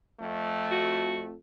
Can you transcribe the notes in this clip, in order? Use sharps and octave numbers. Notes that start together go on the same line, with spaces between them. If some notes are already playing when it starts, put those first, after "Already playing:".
F2 A3
F#4